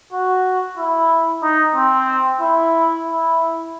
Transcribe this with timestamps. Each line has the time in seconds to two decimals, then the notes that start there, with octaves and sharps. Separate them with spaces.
0.13 F#4
0.78 E4
1.43 D#4
1.76 C4
2.41 E4
3.07 E4